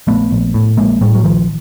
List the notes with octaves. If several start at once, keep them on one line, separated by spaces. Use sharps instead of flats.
A#1 A3 B3
A#1
A2
A#1 G#3 A#3
A2 G3 A3
F#3
A#1 D#3 F3